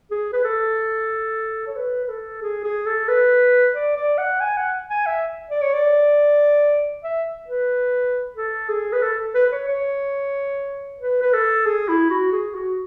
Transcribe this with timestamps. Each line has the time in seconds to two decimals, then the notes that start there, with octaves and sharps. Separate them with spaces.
0.11 G#4
0.33 B4
0.44 A4
1.67 C#5
1.76 B4
2.05 B4
2.09 A4
2.42 G#4
2.64 G#4
2.86 A4
3.08 B4
3.74 D5
3.97 D5
4.18 F#5
4.41 G#5
4.57 F#5
4.90 G#5
5.06 E5
5.50 D5
5.62 C#5
5.73 D5
7.04 E5
7.48 B4
8.36 A4
8.69 G#4
8.92 B4
9.02 A4
9.35 B4
9.46 B4
9.52 C#5
9.68 C#5
11.00 B4
11.22 B4
11.34 A4
11.66 G#4
11.88 E4
12.10 F#4
12.32 G#4
12.55 F#4